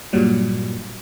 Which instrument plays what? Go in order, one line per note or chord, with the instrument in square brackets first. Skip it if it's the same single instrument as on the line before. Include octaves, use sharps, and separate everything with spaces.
[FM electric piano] G2 A#2 F#3 G3